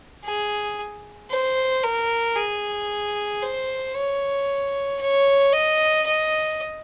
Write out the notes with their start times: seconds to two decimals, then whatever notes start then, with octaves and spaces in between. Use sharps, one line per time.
0.24 G#4
1.31 C5
1.83 A#4
2.36 G#4
3.42 C5
3.94 C#5
5.01 C#5
5.53 D#5
6.06 D#5